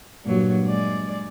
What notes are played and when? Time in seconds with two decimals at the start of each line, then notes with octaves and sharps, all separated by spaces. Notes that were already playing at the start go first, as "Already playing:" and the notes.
0.24 G2 A#2 F#3
0.65 G#3 D5